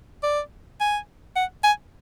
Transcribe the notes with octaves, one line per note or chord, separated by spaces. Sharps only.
D5
G#5
F#5
G#5